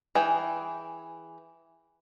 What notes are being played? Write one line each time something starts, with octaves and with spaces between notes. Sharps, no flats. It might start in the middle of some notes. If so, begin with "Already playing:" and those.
E3 G#4 G5